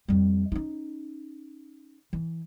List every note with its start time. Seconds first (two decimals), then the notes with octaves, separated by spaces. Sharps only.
0.08 F2 G3
0.52 C#4 D#4
2.13 E3